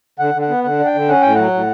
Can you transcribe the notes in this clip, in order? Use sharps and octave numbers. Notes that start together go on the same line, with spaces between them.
D3 F#5
D3
F#5
B3
D3 F#5
D4
G5
D3
C#4 F#5
A2 G5
F#3 F#5
A2